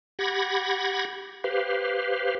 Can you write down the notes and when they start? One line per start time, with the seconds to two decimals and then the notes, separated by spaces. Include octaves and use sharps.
0.19 G4 F#5 B5 G#6 A#6
1.44 G4 B4 C5 F5